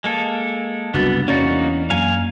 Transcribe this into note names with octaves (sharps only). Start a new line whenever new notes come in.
G#3 A#3 A4
F#1 C2 B3 D4 F#4 A6
E2 A#3 C#4 D#4 F#4 D5 A6
F#2 A#3 F5 G#5